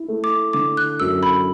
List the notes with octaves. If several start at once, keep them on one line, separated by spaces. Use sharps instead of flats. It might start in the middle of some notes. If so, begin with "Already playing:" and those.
Already playing: E4
A3
D6
D3 D6
F#6
F#2 E6
B5